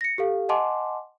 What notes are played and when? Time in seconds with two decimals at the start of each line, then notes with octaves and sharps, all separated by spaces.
0.01 A#6 C#7
0.18 G4 A4 F5
0.49 D#5 F#5 G#5 A5 C6 D6